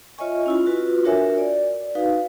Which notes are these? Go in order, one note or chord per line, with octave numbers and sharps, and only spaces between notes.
F4 C#5 D#5 E5 G#5 C#6
C#4 E4 F4
F4 F#4 B4
D4 F#4 A#4 C#5 E5 G#5
D5
D#4 F#4 B4 F5